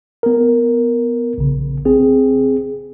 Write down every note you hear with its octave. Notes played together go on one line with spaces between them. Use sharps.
B3 A#4
A#1 C#3
C4 G#4